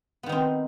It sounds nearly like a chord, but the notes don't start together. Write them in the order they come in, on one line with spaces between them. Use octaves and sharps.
B3 D#3 D#4 C4